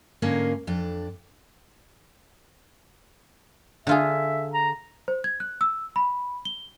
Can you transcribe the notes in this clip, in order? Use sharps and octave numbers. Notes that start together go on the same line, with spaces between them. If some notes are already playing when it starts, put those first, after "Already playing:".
G#2 D3 A#3 C#4 A#4 F5
F2 D4
D3 F4 G#4 E5
A#5
C5
G#6
F#6
E6
B5
G7